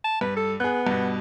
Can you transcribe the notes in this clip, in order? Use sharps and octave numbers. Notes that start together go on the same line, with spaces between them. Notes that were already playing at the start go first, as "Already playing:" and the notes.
A5
G2 B4
A4
B3 G#4 F#6
G2 B2